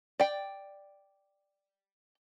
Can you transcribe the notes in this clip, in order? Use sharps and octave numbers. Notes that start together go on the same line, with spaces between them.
D5 G5